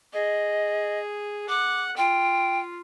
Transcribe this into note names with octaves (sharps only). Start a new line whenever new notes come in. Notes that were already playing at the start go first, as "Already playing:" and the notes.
G#4 D#5
F#5 D6
F4 G5